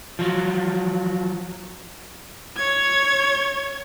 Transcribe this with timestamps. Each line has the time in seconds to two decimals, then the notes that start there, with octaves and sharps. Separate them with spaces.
0.19 F3 F#3
2.57 C#5 G#6